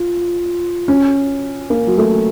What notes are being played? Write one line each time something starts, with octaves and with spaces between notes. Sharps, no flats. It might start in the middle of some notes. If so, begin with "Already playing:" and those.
Already playing: F4
C#4
A#3
F#3
A3